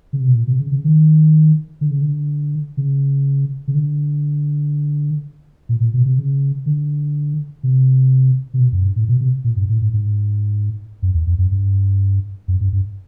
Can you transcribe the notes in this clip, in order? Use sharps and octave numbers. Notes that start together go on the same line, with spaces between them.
C#3
C3
B2
A#2
C3
C#3
C#3
D#3
D3
C#3
D3
C#3
C#3
D3
A#2
A#2
B2
C3
C#3
D3
C3
C3
B2
F#2
G2
A2
B2
C3
A#2
G2
A2
G#2
G#2
F#2
E2
F2
F#2
G2
F#2
G2
G2